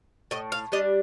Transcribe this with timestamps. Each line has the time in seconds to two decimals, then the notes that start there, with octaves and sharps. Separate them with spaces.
0.31 A2 D#5
0.52 F5
0.72 G3 D4 D#5